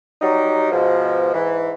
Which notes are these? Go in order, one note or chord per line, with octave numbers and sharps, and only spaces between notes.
F#3 G3 D#4
G#2 B2 F3
G#2 E3